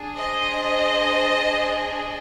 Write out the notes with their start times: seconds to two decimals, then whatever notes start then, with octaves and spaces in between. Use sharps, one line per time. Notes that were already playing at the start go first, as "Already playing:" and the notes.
Already playing: D4 G#4
0.15 C5 D#5